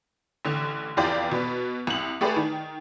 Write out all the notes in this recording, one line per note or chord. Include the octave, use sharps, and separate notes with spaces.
A1 D3
F1 E2 F4 G4 D5 G6
B2 B3
C2 F#7
A3 G4 G#4 B4 D5
D#3